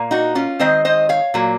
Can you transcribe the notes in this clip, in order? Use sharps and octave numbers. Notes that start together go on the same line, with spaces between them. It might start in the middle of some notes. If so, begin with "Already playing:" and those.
Already playing: A#2 A#3
D#4 F#4
C#4 F4
D#3 G#3 C4 C5 D#5
C5 D#5
C#5 F5
A#2 F#3 A#3